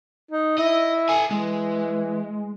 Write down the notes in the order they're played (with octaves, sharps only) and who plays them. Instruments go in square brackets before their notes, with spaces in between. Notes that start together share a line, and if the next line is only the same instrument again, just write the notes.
[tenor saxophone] D#4
[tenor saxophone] E4 [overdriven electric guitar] D#5
[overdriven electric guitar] A4 G#5
[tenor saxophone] E3 [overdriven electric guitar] G#3